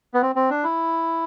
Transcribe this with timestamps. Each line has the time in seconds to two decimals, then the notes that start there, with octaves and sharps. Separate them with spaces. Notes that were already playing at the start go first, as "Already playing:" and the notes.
0.14 B3
0.22 C4
0.35 C4
0.50 D4
0.64 E4